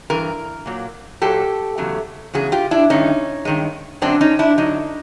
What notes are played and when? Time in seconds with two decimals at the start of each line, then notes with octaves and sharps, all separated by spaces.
0.10 G2 E3 A#4
0.66 A#2 F#3 A#3
1.22 A#2 F#3 A#3 G4 A4
1.78 E2 C#3 F#3 A3
2.34 E2 C#3 F#3 G#4
2.52 F4 G4
2.71 D4 E4
2.90 G2 D#3 G#3 C#4 D#4
3.45 G2 D#3 G#3
4.02 F#2 D3 F#3 C4 D4
4.21 C#4 D#4
4.39 D4 E4
4.58 F#2 D3 F#3 D#4